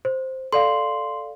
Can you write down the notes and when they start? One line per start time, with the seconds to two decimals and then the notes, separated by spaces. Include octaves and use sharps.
0.05 C5
0.53 A4 D5 F5 C6